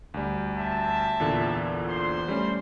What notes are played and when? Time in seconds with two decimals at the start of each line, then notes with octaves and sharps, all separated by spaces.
0.14 D2 G3
0.58 C4 E5 A5
1.20 E2 A#2 D3
1.88 C5 C6
2.28 G3 A3 C#4